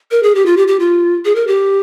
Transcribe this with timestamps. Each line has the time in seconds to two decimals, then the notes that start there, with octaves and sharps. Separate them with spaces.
0.11 A#4
0.23 G#4
0.35 G4
0.46 F4
0.57 G4
0.68 G4
0.79 F4
1.25 G#4
1.35 A#4
1.47 G4